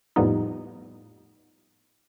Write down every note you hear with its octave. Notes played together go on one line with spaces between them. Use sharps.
F2 A2 F3 G3 B3 D#4